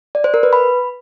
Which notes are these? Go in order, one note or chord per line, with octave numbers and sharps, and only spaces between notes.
D5
C5
A#4
B4
B5